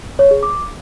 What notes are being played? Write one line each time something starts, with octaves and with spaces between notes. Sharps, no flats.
C#5
G#4
D6